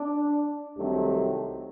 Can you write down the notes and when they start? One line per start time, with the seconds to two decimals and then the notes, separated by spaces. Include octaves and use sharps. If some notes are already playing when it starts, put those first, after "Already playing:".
Already playing: D4
0.77 C2 C3 D#3 F#3 A3